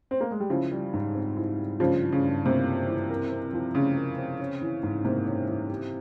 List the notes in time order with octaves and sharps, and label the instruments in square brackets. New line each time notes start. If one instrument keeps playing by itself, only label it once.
[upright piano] C4
A#3
G#3
G3
[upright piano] C#3 F3 [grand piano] E4
[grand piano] G3
G#2
C4
E4
G3
[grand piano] G2 [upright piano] C#3 F3
[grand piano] E3
[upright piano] C#3
[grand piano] G2
[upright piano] C3 [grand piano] A#3
[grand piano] G2
E3
A#4
C4
F3
[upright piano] C#3 [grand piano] F4
[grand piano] A#4
C4
C#4
E3
G#2
[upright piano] C3 [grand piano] A#3
[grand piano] C#4
E3
G4